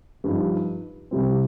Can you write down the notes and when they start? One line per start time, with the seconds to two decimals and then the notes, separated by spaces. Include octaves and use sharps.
0.24 G2 F3 D#4
1.11 C2 C3 G3 C4